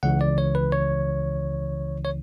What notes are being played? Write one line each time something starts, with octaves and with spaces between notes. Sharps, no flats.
C#2 C#3 E3 F#5
D5
C#5
B4
C#5
C#5